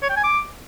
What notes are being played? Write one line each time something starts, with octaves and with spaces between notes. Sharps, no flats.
C#5
G5
G#5
D6